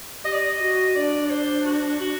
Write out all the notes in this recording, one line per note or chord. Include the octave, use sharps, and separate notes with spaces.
G4 D#5
D5
D#5
F#4
D4 D5
D5
C5
F#4
F#4